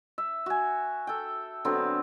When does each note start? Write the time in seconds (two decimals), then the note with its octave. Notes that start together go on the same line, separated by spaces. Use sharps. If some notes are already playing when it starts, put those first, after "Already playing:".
0.18 E5
0.46 F#4 G#5
1.07 A4 G5
1.65 D3 F#3 B3 C4